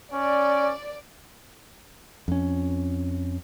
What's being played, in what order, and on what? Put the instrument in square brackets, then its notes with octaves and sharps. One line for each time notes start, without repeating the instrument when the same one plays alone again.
[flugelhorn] C#4 [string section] D5
[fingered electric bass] F2 C#4